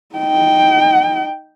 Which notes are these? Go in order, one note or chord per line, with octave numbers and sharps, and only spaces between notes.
D#4 G5